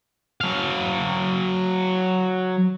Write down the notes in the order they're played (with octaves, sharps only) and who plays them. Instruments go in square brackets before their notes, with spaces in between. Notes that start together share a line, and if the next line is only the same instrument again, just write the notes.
[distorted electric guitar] F#3 F5